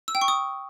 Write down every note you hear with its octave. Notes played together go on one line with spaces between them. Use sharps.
E6
G5
C#6
D#6